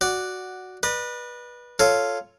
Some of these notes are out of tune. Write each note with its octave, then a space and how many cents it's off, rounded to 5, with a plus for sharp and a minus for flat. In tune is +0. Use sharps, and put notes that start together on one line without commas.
F#4 +0 D5 +0
B4 -20 D5 +40
F4 +0 A4 +0 C#5 +0